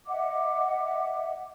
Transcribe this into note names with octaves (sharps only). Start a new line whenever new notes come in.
D#5 E5 F#5 D6